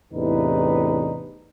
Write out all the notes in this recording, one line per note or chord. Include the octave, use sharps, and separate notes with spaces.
E2 A2 C3 D4 D#4 B4